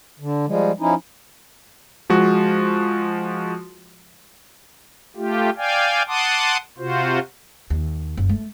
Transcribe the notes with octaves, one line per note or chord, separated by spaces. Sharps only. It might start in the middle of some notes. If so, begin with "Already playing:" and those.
D3
F3 G3 G#3
F3 C#4 D#4 E4
F3 G#3 F#4
A3 F4 G4
D5 F5 G5 G#5
F#5 A5 C6 D6 D#6
C3 F4 F#4 C5
D#2
F#1
A3